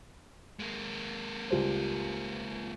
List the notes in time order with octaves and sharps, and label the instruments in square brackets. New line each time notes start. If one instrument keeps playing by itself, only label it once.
[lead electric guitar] G#3 A#3
[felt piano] C#2 G3 C5